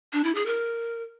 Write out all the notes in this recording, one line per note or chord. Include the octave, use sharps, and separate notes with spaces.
D4
E4
G#4
A#4